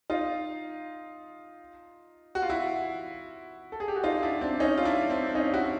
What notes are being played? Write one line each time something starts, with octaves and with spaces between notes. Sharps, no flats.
D#4 F4
F#4
F4
E4 F#4
A4
G#4
G4
F#4
D#4 F4
D4 E4
C4 D4
C#4 D#4
F4
D4 E4
C4 D4
D4
C#4 D#4
E4 F#4